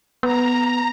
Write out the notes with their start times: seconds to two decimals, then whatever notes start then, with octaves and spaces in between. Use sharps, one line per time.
0.23 B3 A#5